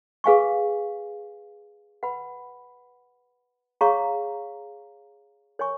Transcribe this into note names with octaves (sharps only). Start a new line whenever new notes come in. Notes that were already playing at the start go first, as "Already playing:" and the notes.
G#4 B4 F5 G#5 C#6
B4 F#5 B5
G#4 C#5 F5 A#5 C#6
A#4 C#5 G#5 C#6